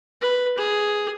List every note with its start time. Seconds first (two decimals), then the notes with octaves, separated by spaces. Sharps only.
0.21 B4
0.58 G#4